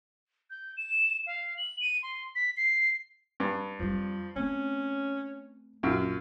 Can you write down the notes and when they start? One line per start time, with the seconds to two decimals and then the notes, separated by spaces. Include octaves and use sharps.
0.50 G6
0.77 E7
1.26 F5
1.58 F#7
1.81 D#7
2.03 C6
2.35 B6
2.57 C7
3.40 G2
3.79 F2 F3 G3
4.36 A3 C4 C#4
5.83 A#1 F#2 F4